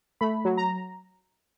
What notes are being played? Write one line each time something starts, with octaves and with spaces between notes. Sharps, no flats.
A3 B5
F#3
A#5